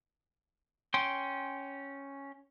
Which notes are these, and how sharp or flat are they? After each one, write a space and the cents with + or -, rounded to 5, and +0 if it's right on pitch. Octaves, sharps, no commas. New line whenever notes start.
C#4 +0 G5 -10 C6 +0